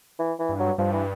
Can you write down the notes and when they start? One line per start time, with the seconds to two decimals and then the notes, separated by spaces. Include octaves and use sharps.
0.19 E3
0.39 E3
0.49 G2
0.60 F#3
0.78 G2 F3
0.93 E3